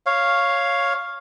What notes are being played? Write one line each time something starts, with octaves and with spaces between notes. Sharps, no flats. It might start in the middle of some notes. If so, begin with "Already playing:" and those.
C#5 F5